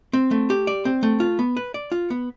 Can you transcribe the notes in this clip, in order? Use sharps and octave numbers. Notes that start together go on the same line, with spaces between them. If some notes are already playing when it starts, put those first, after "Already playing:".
C4
A3
G4
D5
C4
A3
F4
B3
B4
D5
F4
B3